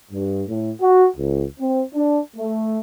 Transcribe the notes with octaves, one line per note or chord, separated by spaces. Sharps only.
G2
A2
F#4
C#2
C4
D4
A3